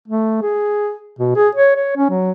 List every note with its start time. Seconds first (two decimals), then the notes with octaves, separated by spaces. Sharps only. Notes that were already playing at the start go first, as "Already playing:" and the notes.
0.08 A3
0.42 G#4
1.19 B2
1.36 G#4
1.55 C#5
1.76 C#5
1.96 C#4
2.10 F#3